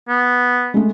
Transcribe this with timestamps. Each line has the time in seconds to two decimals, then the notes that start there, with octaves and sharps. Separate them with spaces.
0.09 B3
0.74 G#3 A3